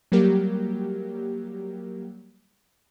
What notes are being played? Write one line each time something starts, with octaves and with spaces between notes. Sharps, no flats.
F#3 G3 A#3 G4 A#4